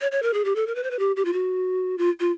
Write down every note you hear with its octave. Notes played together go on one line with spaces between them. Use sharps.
C#5
C#5
A#4
G#4
G4
A4
A#4
B4
C5
B4
G4
G4
F4
F#4
F4
F4